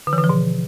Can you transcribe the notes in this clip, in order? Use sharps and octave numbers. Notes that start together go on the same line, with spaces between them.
D3
E3
D3
F3
B2